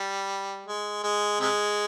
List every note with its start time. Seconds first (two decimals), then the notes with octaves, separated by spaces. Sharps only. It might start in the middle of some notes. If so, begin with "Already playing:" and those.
Already playing: G3
0.66 G#3
1.03 G#3
1.40 C3 G#3